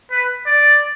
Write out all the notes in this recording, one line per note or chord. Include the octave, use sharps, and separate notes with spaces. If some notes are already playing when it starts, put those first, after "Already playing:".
B4
D5